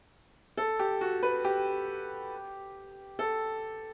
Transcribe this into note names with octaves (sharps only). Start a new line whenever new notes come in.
A4
G4
F#4
B4
G4
A4